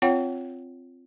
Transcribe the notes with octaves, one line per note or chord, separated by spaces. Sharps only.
C4 F4 C#5 F#5 G5